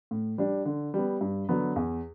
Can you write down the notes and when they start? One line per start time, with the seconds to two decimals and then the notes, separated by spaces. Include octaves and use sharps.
0.11 A2
0.38 G3 D4
0.65 D3
0.94 G3 B3
1.21 G2
1.49 D3 F#3 B3
1.76 E2